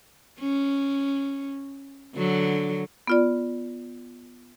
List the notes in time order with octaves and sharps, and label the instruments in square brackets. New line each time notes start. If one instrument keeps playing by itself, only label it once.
[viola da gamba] C#4
D3 F#3
[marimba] B3 F4 D5